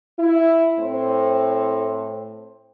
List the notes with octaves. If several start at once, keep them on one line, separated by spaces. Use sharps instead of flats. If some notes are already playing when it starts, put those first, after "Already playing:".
E4
A2 C4